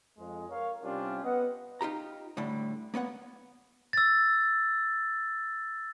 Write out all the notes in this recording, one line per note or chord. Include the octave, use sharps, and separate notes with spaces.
F2 G#3
A#4 C#5 F5
C3 G3 C#4 D4 F4 G4
B3 D#5 F#5
D#4 F4 G4 A#5
A2 D3 G3 A3
A#3 B3 C#5 F#5
E6 A6